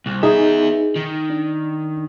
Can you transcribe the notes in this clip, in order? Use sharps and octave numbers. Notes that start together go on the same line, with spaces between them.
C2
B3 D#4 G#4 E5
D#3
D4